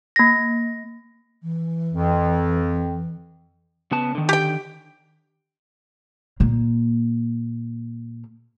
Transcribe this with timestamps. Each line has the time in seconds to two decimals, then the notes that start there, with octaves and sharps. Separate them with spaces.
0.16 A#3 A#6
1.43 E3
1.93 F2
3.91 C#3 B3 A5
4.15 D3 D#3
4.29 G4 G5
6.40 A#2 A#3